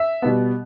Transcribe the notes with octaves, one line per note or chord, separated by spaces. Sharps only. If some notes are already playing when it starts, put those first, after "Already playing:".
Already playing: E5
B2 G3 B3